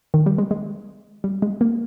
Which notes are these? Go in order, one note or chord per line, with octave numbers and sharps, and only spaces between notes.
D#3
G3
G#3
G#3
G3
G#3
A#3